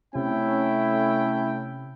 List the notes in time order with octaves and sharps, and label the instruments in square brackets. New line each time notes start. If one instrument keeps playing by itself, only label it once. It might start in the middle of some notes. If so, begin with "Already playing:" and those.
[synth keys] C3 [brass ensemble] A3 C#4 G5 [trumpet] E4